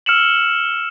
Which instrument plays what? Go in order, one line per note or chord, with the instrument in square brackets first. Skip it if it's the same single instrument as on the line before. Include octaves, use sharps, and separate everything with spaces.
[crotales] E6 F6 C#7 E7 F#7